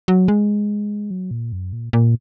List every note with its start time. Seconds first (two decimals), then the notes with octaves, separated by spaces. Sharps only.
0.08 F#3
0.28 G#3
1.11 F#3
1.31 A#2
1.53 F#2
1.73 A#2
1.93 A#2